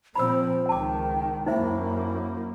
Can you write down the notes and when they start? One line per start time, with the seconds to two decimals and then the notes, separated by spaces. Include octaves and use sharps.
0.15 A#2 F3 C4 C5 B5 E6
0.69 C#2 D#3 G5 A5 D6
1.46 F#2 A#3 D#4 E4 C5 E5